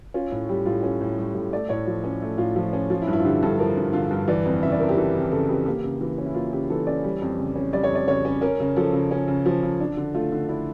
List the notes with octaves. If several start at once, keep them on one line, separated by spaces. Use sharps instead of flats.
C#4 F4
A2
G3 G4
A2 F4
C#4 F4
A2
G3 G4
A2
A3 D5
A2 C#5
F3
C#4
A3
A2 F4
F3
C#4
F3 F4
E4
G2
E4
F4
D3 G4
G2 A4
F3 A#4
G2
D3 F4
G2
E3 D5
F2
C#3 E5
D5
F2 A#4
G4
E3
F2
C#3 A4
F2 G4
A#3 G4
C#3
E3
C#4
E4
A#3 F4
C#3 G4
E3 A4
C#4 D5
G3
F2
C#3
C#4
G3 D5
C#5
F2 D5
C#3 C#5
C#4
C#4 A#4
C#3
F3 A4
C#3
C#4
C#3
F3
C#3
D4
D3
A3 F4
D3
D4 E4